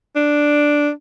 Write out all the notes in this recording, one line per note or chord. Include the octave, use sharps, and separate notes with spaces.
D4